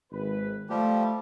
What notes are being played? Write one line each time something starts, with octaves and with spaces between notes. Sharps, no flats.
G#1 B4
F3 G3 A3 G4